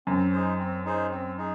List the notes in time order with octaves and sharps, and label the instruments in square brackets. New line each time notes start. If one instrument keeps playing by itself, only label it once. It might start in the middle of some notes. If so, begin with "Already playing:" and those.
[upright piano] F#2 [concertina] C4
[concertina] D#4 G#4 C5
C4
D#4 G#4 C5
C4
D#4 G#4